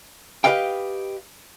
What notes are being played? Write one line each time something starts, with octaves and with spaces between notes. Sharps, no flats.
G4 B4 D#5 F5 G5